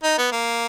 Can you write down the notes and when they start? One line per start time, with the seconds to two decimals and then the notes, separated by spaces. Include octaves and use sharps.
0.03 D#4
0.18 B3
0.32 A#3